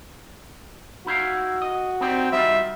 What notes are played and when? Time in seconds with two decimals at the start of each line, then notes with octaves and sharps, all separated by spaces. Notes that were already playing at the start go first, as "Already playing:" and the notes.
1.06 D#4 E4 F#4 F5
1.62 D#5
2.01 C4 D#4 G4 D5
2.32 G3 D#4 F4 E5